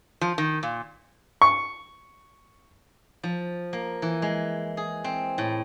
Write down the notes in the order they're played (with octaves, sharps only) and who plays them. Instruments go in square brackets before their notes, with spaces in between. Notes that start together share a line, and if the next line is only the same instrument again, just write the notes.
[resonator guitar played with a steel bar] F3
D#3
A#2
[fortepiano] C#6
[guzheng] F3
A#3
E3
G#3
G#4
C4
A2